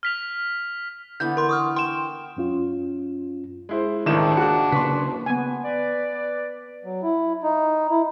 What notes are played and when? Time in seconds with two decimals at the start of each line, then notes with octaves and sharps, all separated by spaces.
0.03 F6 B6 F7
1.20 D3 E3 B3 G6
1.37 A#4 C6
1.49 C#6 D#6 F6
1.76 G5 C6 E7
2.37 F#2 C#4 F4
3.69 G#3 E4 C5
4.06 G#1 C#2 A2 D#3 D4 E4 E7
4.37 D#2 F#4 G#4 F#6 C#7
4.72 C#3 A#3 B4 C6 C#6 B6
5.26 B3 G#5
5.64 B4 D5
6.84 F#3
7.03 E4
7.43 D#4
7.90 E4